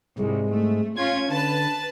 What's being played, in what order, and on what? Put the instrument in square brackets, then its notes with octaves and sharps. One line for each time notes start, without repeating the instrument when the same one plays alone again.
[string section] C2 [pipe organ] G#2 G#3
[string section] A3
[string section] C#4 F4 [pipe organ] G#6
[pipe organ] D3 [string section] B4 A5